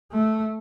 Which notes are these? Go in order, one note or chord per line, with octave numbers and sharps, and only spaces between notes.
A3